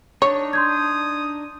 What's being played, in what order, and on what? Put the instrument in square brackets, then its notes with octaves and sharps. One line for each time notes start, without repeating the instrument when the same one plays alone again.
[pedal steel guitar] D4 D#4 [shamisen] C#5
[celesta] C6 G6 G#6 [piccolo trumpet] D#6